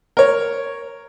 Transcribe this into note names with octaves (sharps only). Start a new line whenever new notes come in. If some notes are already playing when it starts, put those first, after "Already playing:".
A#4 C#5